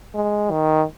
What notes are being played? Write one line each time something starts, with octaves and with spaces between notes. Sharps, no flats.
G#3
D#3